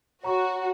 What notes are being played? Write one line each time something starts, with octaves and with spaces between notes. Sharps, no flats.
F#4 C#5 A#5 C#6